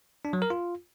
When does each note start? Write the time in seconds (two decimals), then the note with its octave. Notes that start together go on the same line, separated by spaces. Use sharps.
0.25 D4
0.33 F#3
0.42 A#4
0.50 F4